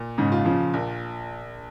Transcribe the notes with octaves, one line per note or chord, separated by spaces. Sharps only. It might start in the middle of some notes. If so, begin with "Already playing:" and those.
Already playing: A#2
G#2 C#3
F4
C#3 F3
A#1